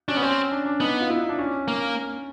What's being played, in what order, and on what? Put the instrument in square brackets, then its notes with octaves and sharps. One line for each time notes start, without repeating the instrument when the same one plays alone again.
[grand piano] C#4 [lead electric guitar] D4
[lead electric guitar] B3
[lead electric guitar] C4 [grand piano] C#4
[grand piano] D4
D4
[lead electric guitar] B3 [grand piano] D#4
[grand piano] F4
E4
D#4
D4
C#4
[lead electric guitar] A#3